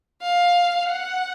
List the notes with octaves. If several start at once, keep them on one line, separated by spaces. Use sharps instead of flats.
F5
F#5